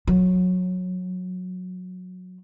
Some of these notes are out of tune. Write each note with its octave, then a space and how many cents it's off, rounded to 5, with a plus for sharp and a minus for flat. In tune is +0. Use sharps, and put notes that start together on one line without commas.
F#3 -20